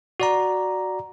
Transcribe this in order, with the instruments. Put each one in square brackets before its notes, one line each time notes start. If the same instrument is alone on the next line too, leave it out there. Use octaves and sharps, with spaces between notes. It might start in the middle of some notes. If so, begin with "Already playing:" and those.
[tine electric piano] F#4 D5 A#5